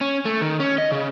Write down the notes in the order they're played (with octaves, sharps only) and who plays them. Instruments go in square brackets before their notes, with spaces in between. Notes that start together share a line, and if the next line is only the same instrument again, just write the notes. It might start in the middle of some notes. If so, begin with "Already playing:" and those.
[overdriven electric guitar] C#4
A3
D#3
C#4
D#5
C#3